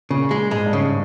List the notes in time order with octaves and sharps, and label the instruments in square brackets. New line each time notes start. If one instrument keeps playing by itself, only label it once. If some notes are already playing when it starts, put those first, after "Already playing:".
[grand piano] A#2 [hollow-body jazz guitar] C#3
[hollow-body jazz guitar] G#3
[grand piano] G#2 [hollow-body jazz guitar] G#3
[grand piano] G2
[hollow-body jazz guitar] C#3